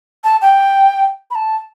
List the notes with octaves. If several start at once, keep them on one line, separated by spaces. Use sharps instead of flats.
A5
G5
B5
A5